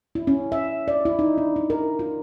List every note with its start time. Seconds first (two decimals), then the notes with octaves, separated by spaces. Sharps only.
0.15 E4
0.27 C#4
0.52 E5
0.88 D5
1.05 E4
1.19 D#4
1.38 D4
1.56 D#4
1.70 A#4
1.99 F4